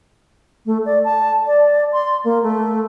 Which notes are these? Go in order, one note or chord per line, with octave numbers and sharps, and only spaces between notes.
A3
D5
A5
D5
C6
A#3
A3